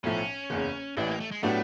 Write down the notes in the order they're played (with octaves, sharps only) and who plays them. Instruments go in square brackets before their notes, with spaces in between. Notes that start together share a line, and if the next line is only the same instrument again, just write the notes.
[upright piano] B1 A2 F3 A3 [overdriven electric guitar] C#4
[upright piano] F#1 E2 C#3
[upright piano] A1 A2 E3 [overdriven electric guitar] D4
[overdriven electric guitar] A#3
A3
G#3
[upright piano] A2 F#3 B3 D4 G4 [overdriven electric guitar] A3